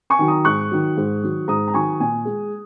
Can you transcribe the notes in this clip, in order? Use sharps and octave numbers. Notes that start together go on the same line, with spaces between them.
G#5 C#6
D#3 F#3
A#5 D#6
G#2 C#6 F#6
D#3 F#3
G#2
D#3 F#3
G#2 A#5 D#6
A#5
D#3 F#3 G#5 C#6
A#2 G#5
G#3